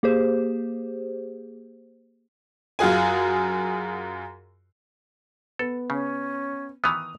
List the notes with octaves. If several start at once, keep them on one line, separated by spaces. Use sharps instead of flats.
A#3 G4 G#4 C5
F#2 F4 F#4 G#4 G#5
B3 A4
C#3 C#4
D#3 E3 B3 D#6 F7